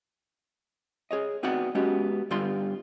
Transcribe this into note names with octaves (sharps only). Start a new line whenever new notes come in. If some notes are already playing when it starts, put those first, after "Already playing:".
G#4 C#5 D#5
B3 C4 D#4 F#4 D5 F#5
G#3 B3 C#4 F#4 G4
G2 D3 G3 B3 F4 C6